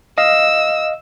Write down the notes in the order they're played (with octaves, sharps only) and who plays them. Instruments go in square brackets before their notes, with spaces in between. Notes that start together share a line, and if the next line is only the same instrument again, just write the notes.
[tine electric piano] D#5 F5 [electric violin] E6